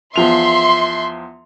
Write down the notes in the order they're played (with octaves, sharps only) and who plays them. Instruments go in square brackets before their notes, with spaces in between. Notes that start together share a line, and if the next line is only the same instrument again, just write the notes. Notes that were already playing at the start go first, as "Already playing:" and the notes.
[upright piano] E2 F3 F7 [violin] E5 [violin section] C6